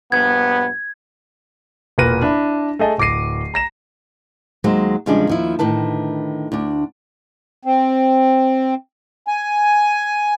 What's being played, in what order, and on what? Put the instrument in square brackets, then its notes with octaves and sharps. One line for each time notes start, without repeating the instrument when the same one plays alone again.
[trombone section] A#1 G2 B3 [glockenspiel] G#6
[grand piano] E1 A#2 A#4 B4 A#6 D#7
D4 E4 B5
A3 G#4 D#5 A5
D1 D6 A#6 C7 D#7
A#5 A#6 E7
[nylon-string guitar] D#2 F#3 G#3 C5
E2 C#3 F3 G3 G#3 D4
D#2 F3 E4
A2 D3 D#3 B4 A5
D2 D4
[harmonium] C4
G#5